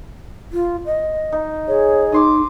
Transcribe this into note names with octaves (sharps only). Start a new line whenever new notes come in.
F4
D#5
D#4
G#4 C#5
D#4 D#5 C6 D6